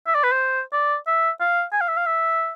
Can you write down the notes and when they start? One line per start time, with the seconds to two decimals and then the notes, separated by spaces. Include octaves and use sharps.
0.07 E5
0.15 D5
0.24 B4
0.32 C5
0.73 D5
1.07 E5
1.40 F5
1.73 G#5
1.81 F5
1.88 E5
1.97 F5
2.07 E5